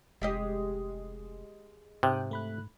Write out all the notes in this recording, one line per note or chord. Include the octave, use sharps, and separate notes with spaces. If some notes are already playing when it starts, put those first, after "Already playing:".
F1 G#3 G4 D#5
G#2 C3 G5 D#6 F#6
A3 B5 F#6